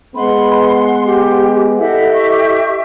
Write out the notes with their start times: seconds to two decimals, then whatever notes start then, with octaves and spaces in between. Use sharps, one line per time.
0.15 G#3 B3 F#5 B5 C6
1.05 G4
1.79 E4 G4 A4 D#5 E5 F#5
2.13 C#6